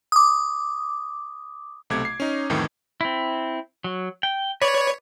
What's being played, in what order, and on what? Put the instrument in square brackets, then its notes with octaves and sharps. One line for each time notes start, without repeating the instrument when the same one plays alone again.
[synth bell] D6 D#6
[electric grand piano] B1 C3 A3 D6 G#6
C7
C#4 D#4
C2 F2 A2 D#3 E3
[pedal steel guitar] C4 E4
F#3
G5
[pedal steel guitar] B4 D5 [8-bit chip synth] C#5